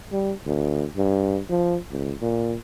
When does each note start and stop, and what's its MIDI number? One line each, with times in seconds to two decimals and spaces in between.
0.12 0.32 55
0.46 0.85 38
0.97 1.40 43
1.50 1.77 53
1.91 2.13 37
2.21 2.55 46